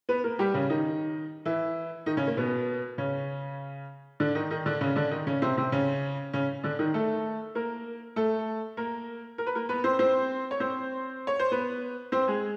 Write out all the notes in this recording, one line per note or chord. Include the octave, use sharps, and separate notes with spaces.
B3 B4
A#3 A#4
G3 G4
C#3 C#4
D#3 D#4
E3 E4
D#3 D#4
C#3 C#4
A#3
B2 B3
C#3 C#4
D3 D4
D#3 D#4
D#3 D#4
D3 D4
C#3 C#4
D3 D4
D#3 D#4
C#3 C#4
C3 C4
C3 C4
C#3 C#4
C#3 C#4
D3 D4
D#3 D#4
A3 A4
A#3 A#4
A3 A4
A#3 A#4
A#4
B4
A#3 A#4
B3 B4
C4 C5
C4 C5
C#5
C4 C5
C#5
C5
B3 B4
C4 C5
G#3 G#4